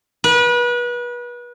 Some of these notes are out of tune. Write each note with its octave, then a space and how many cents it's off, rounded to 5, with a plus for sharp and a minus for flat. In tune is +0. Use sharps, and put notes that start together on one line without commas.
B4 -30